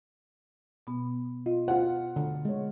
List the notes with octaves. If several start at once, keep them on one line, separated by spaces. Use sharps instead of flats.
B2 B3
F4 D#5
F4 C5 F#5
D3
G#3 C#5